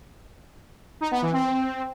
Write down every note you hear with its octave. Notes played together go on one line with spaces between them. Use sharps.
D#4
B3
E3
C4